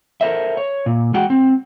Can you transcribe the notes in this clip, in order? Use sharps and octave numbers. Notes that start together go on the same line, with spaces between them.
A4 A#4 C5 E5
C#5
A#2
G#3 F#4 F#5 G5
C4